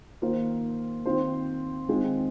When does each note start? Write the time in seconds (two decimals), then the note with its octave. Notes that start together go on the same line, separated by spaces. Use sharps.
0.22 D#3 A#3 F4 C5
1.06 D#3 C4 F4 C5
1.89 D#3 G#3 C4 F4 G#4